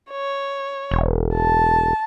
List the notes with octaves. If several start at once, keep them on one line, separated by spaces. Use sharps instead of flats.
C#5
E1
A5